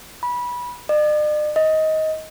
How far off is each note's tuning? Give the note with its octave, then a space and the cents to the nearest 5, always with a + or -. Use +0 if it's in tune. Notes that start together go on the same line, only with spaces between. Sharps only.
B5 -20
D5 +45
D#5 +15